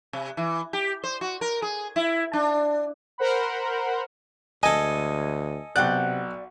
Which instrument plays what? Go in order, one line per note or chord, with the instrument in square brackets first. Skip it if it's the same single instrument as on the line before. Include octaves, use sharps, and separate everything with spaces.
[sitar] C3
E3
G4
C5
F#4
A#4
G#4
E4
D4
[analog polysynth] A#4 C5 F#5 B5
[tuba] D2 [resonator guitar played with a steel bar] G#3 [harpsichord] A4 D#5 [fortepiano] G#5
[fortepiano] B1 F#6 [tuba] C3 [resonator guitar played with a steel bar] D5 F#5 G5